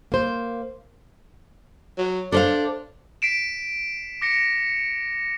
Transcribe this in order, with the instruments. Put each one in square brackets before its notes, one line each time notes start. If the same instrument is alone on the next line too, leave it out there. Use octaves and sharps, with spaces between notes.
[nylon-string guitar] A#3 C5
[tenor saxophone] F#3
[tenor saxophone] D4 [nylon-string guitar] A4 C5 F5
[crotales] B6 C7 D7 E7
D6 A#6 C#7